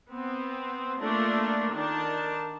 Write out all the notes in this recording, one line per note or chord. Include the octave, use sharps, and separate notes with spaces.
B3 C4
A3 A#3 D4 F4 A4 A#4
D#3 D4 A5